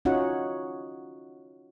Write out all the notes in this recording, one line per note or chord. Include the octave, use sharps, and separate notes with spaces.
C#4 D#4 F4 F#4 C#5 F#5